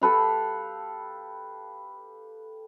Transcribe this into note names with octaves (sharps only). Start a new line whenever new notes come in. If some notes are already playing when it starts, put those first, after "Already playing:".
G4 A4 B4 F5